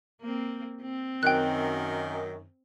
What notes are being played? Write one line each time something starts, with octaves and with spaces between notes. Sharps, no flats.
A#3 C4
C4
F#2 D#3 G5 F#6